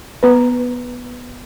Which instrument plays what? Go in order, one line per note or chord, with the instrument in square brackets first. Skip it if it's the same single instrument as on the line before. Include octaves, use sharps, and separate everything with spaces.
[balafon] B3 B4